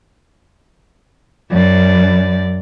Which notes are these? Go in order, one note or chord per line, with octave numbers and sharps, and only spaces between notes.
F#2 D5